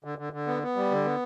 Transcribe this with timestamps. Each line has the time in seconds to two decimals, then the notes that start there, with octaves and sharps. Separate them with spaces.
0.04 D3
0.18 D3
0.33 D3
0.47 B3
0.63 B3
0.76 G3
0.91 D3
1.05 B3